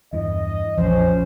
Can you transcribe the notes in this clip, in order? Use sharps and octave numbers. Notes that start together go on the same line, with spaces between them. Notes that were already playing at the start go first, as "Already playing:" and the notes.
E2 G2 E3 D#5
A#1 F2 E3 F3 C#4 C5